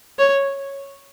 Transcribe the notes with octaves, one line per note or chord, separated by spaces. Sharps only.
C#5